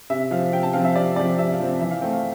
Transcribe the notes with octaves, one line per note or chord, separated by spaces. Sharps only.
C3 E5
F3 C4 F5
C3 G5
A5
F3 C4 F5
E5
C3 D5
F3 C4 D5
C3 E5
F5
F3 C4
E3 E5
F5
A3 C4 G5
F5